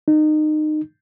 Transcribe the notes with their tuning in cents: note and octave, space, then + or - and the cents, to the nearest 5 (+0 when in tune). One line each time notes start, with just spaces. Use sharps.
D#4 -25